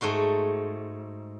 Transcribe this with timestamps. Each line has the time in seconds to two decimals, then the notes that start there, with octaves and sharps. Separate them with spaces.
0.01 G#2 A3 F#4 C6